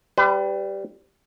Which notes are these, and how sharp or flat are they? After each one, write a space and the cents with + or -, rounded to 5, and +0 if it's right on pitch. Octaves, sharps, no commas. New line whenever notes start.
G3 +0 B4 +45